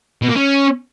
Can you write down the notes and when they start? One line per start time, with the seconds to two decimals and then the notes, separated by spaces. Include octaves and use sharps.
0.22 B2
0.29 A#3
0.35 C#4